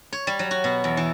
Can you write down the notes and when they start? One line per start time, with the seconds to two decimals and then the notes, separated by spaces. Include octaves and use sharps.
0.13 C#5
0.27 G3
0.39 F#3
0.51 F#4
0.64 B2
0.84 E2
0.97 E3